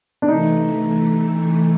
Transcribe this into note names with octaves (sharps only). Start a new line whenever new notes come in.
D4
C3 E3 A3 D#4